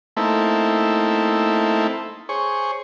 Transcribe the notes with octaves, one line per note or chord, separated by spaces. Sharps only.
A3 A#3 C4 D#4 E4 A4
G#4 C5 C#5 C#6